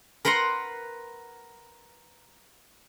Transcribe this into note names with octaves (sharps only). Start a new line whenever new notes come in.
A#4 B4 F#5 A#5 C6